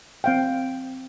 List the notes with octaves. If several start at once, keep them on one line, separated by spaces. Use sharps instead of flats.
C4 F5 G5